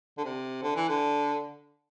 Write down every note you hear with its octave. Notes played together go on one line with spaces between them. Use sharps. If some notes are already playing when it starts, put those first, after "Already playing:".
D3
C3
D3
E3
D3